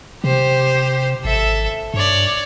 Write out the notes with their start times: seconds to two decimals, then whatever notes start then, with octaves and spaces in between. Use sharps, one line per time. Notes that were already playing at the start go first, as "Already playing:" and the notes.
0.24 C3 G4 C5
1.25 G#1 A4 E5
1.94 G2 C#5 D5